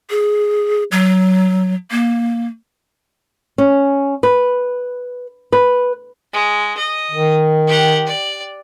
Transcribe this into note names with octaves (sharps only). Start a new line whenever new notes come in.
G#4
F#3
A#3
C#4
B4
B4
G#3
D#5
D#3
G4 F#5
D5